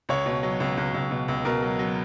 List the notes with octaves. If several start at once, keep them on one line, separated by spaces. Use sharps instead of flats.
C#2 C#5
B2
F#3
C#2
C#2
C#2
B2
C#2
B2 A#4
F#3
F#3